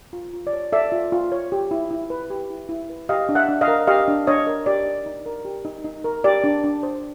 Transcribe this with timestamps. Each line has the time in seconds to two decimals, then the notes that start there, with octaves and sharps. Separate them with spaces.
0.13 F4
0.33 F4
0.47 D5
0.53 C#5
0.73 A4 D5 E5
0.92 F4
1.12 F4
1.32 C#5
1.52 G4
1.71 E4
1.91 E4
2.10 B4
2.30 G4
2.51 E4
2.69 E4
2.90 B4
3.09 G4 D#5 F5
3.29 D4
3.35 E5 F#5
3.49 D4
3.61 D#5 F5
3.68 A#4
3.87 G4 D#5 F5
4.08 D4
4.27 D4 C#5 D#5
4.47 A#4
4.66 G4 D5
4.86 D#4
5.06 D#4
5.26 A#4
5.45 G4
5.65 D#4
5.84 D#4
6.04 A#4
6.24 G4 D5
6.44 D4
6.64 D4
6.83 C5